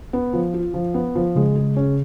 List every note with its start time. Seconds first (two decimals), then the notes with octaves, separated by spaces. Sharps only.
0.13 B3
0.33 F3
0.54 F4
0.74 F3
0.94 B3
1.15 F3
1.35 C#3 G#3
1.56 G#4
1.76 C#4